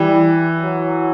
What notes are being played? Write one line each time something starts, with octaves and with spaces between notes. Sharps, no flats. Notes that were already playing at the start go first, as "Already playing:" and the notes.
Already playing: E3 G3
F#3